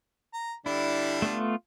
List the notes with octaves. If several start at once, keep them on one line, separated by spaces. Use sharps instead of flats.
A#5
D3 G3 D4 E4
A3 B3 F4